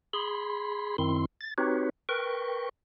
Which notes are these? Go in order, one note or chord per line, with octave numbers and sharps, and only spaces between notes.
G#4 B5 C6
F#2 D#3 C4 E4 C6
A6
C4 D#4 F#4 G4 B4 C#5
A#4 B4 G5 C#6